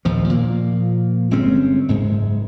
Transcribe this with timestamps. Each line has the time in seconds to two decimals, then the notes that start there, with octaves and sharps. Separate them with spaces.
0.05 A#1 D#2 F3
0.29 A#2 F3 A#3
1.31 G1 G#3 C4 C#4
1.88 F#1 G#2 G#3